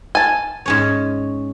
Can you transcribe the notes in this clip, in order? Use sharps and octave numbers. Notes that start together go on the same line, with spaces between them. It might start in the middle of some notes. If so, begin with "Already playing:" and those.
G#5 A5
G#2 C#4 C#5